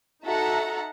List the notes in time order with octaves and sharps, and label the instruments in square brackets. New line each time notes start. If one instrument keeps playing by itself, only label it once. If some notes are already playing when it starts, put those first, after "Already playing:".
[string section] D#4 F#4 A4 E5 F#5 A#5